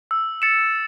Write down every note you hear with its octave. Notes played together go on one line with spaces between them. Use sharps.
E6
A6 C#7 E7